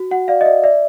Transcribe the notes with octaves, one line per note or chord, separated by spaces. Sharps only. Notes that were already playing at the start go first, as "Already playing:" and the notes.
Already playing: F#4
F#4 F#5
D5 F5
D#5
D5 E5
D5 E5